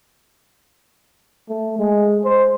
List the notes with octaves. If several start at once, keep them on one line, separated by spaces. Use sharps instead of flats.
A3
G#3
C5